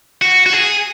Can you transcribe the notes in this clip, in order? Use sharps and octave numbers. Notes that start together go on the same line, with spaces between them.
F#4
F#4
G#4